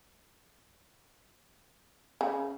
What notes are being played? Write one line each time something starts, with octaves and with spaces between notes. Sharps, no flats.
C#3